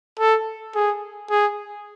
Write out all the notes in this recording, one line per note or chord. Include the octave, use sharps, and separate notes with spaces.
A4
G#4
G#4